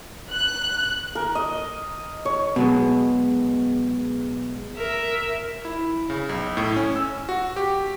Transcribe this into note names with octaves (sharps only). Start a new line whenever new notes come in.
F#6
A#4
D#5
C#5
B2 F#3 G#3
A#4 E5
E4
C#3
B1
A2
C#4
E6
F#4
G4